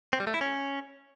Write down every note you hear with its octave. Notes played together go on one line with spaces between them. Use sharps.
C4
G3
A3
E4
C#4